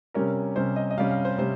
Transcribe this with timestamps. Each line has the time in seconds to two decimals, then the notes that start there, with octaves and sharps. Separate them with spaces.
0.14 C3 G3 C#4 A#4
0.56 C3 G3 C#4 C5
0.76 D#5
0.91 D#5
0.97 C3 G3 C#4 F5
1.11 F5
1.25 C5
1.38 C3 G3 C5